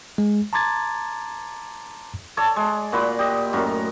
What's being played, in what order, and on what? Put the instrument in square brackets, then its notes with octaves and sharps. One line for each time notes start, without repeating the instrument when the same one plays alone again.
[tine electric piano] G#3
A5 A#5 C6 D6 G#6 A6
[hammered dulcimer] A4 C#5 D5 A5
G#3
A#2 F#4 B5 C6
G4 D#5
F#2 A2 F#4 A#4